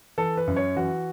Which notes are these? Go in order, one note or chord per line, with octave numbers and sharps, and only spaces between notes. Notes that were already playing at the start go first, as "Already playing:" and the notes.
E3 A4
B4
F#2
C#5
E3 F#4